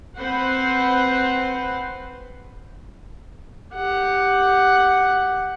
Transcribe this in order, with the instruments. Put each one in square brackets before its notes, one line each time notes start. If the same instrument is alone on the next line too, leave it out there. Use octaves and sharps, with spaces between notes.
[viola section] C4 B4 C5 F#5
[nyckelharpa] G4 F#5